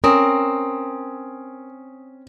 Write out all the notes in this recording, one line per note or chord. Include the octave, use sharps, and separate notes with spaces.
C4 C#4 A#4 D#6